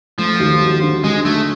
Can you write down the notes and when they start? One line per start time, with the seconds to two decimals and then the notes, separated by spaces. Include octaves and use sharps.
0.18 F3 A3
0.40 D#2
0.62 F#3
0.82 D3
1.04 D3 G#3
1.25 F#3 A3